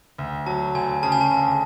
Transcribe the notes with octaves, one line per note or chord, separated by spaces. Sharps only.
D2
F#3 A5
D2 G#5
C#3 A5
G#5
A5
D2